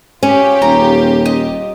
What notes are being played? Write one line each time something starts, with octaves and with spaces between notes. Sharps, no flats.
C#4 F4 G4
D#1 A#5
D#5